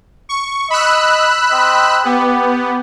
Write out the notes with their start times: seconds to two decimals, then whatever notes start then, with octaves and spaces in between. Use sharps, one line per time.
0.29 C#6
0.70 D#5 B5 E6 F#6
1.51 C4 D#5
2.05 B3 G4